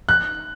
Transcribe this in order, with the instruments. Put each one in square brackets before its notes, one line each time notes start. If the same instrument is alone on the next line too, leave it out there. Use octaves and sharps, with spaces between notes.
[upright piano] F#6